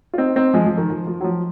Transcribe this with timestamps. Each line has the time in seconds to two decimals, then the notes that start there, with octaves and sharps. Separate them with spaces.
0.14 F4
0.18 C4 D#4
0.35 C4 D#4
0.54 F3 G#3
0.66 F3
0.77 D#3
0.90 F3
1.07 F3
1.21 F#3
1.24 F3